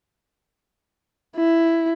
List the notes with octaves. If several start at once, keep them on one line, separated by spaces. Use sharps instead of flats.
E4